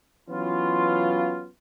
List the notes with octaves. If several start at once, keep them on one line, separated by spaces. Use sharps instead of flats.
E3 F#3 B3 C#4 F4